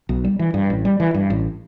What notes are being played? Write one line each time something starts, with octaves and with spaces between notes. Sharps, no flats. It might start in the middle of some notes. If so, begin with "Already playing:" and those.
B1
G3
E3
G2
A1
G3
E3
G2
A1